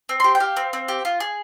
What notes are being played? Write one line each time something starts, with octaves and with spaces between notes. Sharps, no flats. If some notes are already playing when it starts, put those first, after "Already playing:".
C4
G4 C6
G5
G4 F5
C4
C4
G4
F4
G#4